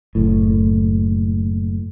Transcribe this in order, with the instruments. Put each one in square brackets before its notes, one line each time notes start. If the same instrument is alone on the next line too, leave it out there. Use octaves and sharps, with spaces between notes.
[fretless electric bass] F#1 A2